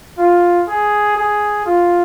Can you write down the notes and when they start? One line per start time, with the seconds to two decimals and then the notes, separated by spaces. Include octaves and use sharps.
0.18 F4
0.68 G#4
1.16 G#4
1.66 F4